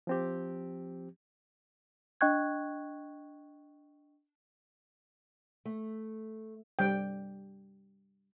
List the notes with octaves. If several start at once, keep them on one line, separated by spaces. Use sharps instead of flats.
F3 C4 G4
D4 D#5 G5 C#6 F#6 G#6
A3
G3 G5